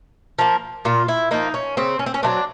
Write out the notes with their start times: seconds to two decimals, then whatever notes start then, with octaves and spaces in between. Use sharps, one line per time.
0.38 F3 A#3
0.85 A#2 F4
1.08 E4
1.31 F3 A#3 D#4
1.54 C#4
1.77 C#3 C4
1.99 C#4
2.06 C4
2.14 C#4
2.23 F#3 A3 C4 D4